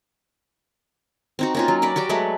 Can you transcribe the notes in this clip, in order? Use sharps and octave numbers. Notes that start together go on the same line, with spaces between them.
C4 D#4 F#4
A#3 C#4 F4
F#3
A#4 B4 D5
F#4 G4 D5 G5
F#3 G#3 A3 B4